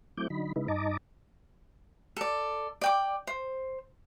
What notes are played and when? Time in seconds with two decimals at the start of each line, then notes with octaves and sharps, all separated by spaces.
0.17 F#3 A3 C4 E4 D6 G6
0.30 D3 F#3 D#4 B5
0.56 C#3 G#3 D#4 E4 B4
0.68 G2 D#4 D#5 A5 A#5 D6
2.17 A4 D5
2.81 D5 G5 D6
3.27 C5